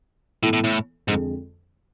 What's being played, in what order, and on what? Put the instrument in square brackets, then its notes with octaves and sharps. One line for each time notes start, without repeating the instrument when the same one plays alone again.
[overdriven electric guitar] A2 [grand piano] E3 B3 E4 A4
[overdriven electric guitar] A2
A2
[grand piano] F2 D3 G#3 [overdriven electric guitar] G#2